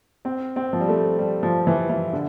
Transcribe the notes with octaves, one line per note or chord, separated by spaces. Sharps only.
C4
C4
F3
G3
A3
G3
F3
E3
E3
D3